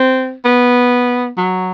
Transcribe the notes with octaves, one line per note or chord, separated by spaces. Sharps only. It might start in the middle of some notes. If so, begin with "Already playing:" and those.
Already playing: C4
B3
F#3